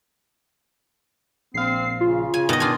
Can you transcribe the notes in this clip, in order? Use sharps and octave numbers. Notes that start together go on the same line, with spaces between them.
A#1 C4 F5 C7
C#3 F4
C#3 G#5
B2 D#3 D#5
D4 F4 G#5